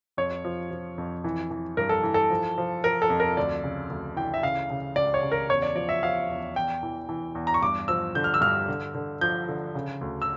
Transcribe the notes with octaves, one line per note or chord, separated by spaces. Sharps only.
F2 C#5
F3
F3
F2
E3
E3
G2 A#4
A4
E3
A4
F3
F3
F3 A#4
A4
F2
A#4
D2 D5
C#3
D2
E3 G5
E5
C#3 F5
C#3
C#2 D5
C#5
C#3
A#4
E2 C#5
D5
F3 D5
E5
F3 F5
E2
E2 G5
E3
E3
E2
A#5
C#6
G2 D6
F3 E6
D3 G6
F6
E6
G2 F6
D3
D3
F3 G6
D3
C#3
D2
E6